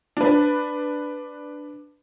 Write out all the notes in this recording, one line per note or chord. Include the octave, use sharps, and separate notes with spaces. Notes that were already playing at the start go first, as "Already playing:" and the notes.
D4 B4